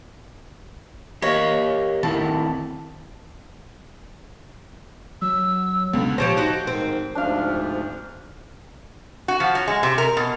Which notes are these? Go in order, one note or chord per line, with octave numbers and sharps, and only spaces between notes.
G4 A#4 C#5 D#5
D#3 C4 E4 A5
F#3 E6
C#2 B2 D3
F3 G4 C5 C#5 A5 A#6
D#4 F#4 G4 C5
G#2 D#3 C4
D2 G#2 F3 D4 F5
F#4
F3
F#3
G#3
C3
A#4
B2